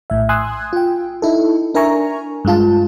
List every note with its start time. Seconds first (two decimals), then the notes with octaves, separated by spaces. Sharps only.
0.10 A#1 A2 E5
0.29 G#5 C6 D#6 E6 F#6 G#6
0.73 F4 G5
1.22 D#4 E4 A4
1.74 D4 A#4 E5 G#5 A#5 C#6
2.45 G2 G#3 F4 A5